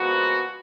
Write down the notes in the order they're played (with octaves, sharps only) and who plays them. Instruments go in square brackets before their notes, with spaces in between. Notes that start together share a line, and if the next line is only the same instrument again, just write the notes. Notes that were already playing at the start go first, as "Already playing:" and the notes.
Already playing: [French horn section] A#2 F3 G#3 B3 F#4